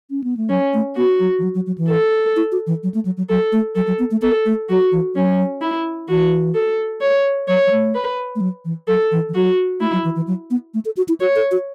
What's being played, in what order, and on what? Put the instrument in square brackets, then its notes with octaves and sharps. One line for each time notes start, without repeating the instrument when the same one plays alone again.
[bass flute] C#4
B3
A3
[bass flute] F#3 [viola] C#4
[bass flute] A3
[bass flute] B3 [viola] F#4
[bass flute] F#3
E3
F#3
F#3
F#3
E3
[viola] A4
[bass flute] E4
F#4
E3
F#3
A3
F#3
F#3
[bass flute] F#3 [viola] A4
[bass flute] A3
[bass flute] F#3 [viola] A4
[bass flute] F#3
B3
A3
[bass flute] B3 [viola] A4
[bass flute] A3
[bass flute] F#3 [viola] F#4
[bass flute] E3
[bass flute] F#3 [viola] C#4
[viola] E4
[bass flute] E3 [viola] F#4
[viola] A4
C#5
[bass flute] F#3 [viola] C#5
[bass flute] F#3
A3
[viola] B4
[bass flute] A3
F#3
E3
[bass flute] F#3 [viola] A4
[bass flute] E3
E3
[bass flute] F#3 [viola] F#4
[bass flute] A3 [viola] E4
[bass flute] F#3
E3
E3
F#3
B3
A3
A4
F#4
E4
[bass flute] F#4 [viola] C#5
[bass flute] A4
F#4